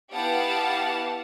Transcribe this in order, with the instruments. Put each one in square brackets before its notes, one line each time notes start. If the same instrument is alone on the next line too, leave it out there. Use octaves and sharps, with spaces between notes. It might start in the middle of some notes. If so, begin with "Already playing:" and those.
[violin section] B3 E4 G4 F5 F#5 A5